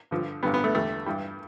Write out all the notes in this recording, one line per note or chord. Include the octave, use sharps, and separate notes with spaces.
G2 D3 F3
A1 G2 D3 G3 B3
B3
A3
E2 D3 G3 A3
G2 E3 G3